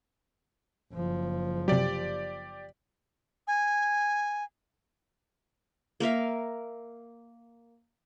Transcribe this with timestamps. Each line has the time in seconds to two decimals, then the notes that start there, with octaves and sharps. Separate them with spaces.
0.93 F#1 F3
1.68 C3 F#3 G4 D5
3.47 G#5
6.00 A#3 A#4 E5 F5